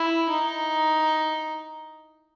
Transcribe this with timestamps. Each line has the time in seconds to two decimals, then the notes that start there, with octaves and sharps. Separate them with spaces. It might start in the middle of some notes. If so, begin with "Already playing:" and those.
Already playing: E4
0.30 D#4